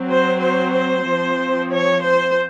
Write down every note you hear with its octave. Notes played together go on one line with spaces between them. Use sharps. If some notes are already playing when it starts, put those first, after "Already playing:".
Already playing: F#3 C4
C5
C5
C5
F3 C4
C#5
C5